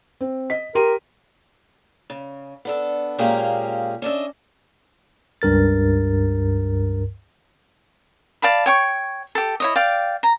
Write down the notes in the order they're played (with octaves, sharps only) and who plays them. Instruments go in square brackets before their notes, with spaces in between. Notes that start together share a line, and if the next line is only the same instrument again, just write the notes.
[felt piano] C4
D#5 B6
[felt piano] G4 C6 D#7 [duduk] A#4
[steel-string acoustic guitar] C#3
B3 D4 A4
A#2 G#3 A#3 C#4 G4 G#4
C#4 D4 D#5 E5
[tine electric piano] C#2 G2 A#4 A6
[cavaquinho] D5 F5 A5 B5
C#5 G5 C#6
G4 A4
E4 C#5 D#5
D5 F5 G5 D6
A#5